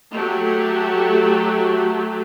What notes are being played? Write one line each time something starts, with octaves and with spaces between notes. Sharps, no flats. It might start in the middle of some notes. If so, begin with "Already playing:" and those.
F#3 A3 G4